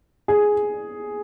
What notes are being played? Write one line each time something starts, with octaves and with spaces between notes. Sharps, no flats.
G#4